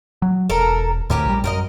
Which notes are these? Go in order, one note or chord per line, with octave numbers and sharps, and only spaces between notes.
F#3
E1 A4 A#4
D2 A2 C#4 G4 A#4
A#1 G3
F#2 A#4 C5 D#5